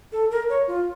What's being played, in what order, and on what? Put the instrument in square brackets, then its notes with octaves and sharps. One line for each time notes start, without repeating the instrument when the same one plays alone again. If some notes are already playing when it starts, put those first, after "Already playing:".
[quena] A4
A#4
C#5
F4